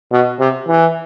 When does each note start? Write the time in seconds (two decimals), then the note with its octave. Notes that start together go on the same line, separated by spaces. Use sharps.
0.12 B2
0.40 C3
0.69 E3